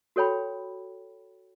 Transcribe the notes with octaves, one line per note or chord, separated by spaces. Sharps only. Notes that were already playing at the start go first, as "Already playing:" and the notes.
F#4 A4 C#5 G5 B5